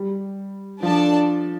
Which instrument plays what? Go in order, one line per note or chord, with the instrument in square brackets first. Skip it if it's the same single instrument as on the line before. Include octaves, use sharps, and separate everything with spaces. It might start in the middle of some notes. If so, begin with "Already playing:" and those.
Already playing: [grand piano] G3
[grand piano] F3 [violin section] D4 A4 D5 A5